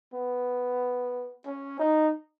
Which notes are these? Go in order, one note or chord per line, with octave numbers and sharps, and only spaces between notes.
B3
C#4
D#4